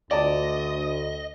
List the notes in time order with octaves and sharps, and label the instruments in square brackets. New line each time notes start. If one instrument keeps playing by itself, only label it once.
[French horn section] D2 [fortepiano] D5 A5 [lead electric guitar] D#5